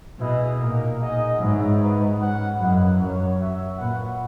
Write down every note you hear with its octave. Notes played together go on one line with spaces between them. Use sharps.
B2 E4 G#4 B4 D#5
A#2 A#3 D#4 A#4 D#5
D#4 G#4 D#5 F#5
G#2 G#3 B3 F#4 C#5 E5
B3 F#4 B4 D#5
C#4 F#4 B4 F#5
F#2 A#3 E4 B4 D#5 F#5
F#2 F#4 A#4 C#5
F#4 C#5 E5
A#2 F#4 B4 F#5